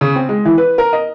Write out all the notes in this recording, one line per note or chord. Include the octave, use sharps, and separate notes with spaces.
C#3
C4
G#3
E3
B4
A#4
D#5